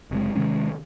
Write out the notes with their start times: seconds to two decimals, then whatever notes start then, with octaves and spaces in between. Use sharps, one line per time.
0.11 F#1 C3 G#3
0.35 C3 D#3 G#3 C#4